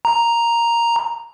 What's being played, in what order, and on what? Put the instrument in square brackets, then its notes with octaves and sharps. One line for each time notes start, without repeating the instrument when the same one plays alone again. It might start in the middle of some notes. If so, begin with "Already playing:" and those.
[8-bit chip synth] A#5